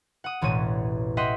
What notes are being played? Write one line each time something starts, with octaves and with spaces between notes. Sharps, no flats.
F#5 D#6
E1 A1 B2 C#5 D#7
D#5 E5 F#5 G5 C6 B6